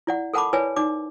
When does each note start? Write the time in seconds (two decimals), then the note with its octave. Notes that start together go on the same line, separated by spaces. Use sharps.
0.07 E4 D5 F#5
0.34 A4 A#4 F#5 A5 B5 D6
0.53 E4 A#4 B4 C#5 D5 G#5
0.76 D#4 D5 D6